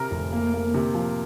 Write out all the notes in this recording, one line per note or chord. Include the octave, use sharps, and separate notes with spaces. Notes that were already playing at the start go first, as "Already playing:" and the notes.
Already playing: C3 A#4
F1
A#3
A#3
C3
F3